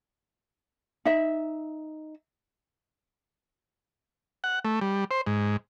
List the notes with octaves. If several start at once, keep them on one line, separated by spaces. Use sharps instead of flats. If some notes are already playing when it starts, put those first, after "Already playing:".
D#4 E5
F#5
A3
G3
C5
G#2